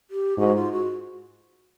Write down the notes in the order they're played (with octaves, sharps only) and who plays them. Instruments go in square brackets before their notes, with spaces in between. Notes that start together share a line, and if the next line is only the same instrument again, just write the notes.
[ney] G4
[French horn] G#2 [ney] F#4
[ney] F4
F#4